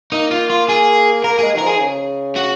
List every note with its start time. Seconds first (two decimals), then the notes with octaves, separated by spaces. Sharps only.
0.12 A#3 D#4
0.31 F4
0.50 F4
0.68 G#4
1.24 A#3 A#4
1.39 G#3 G#4
1.55 D#3
1.58 A#4
1.62 F3 G#4
1.76 D#3
1.80 C#3
2.36 F#4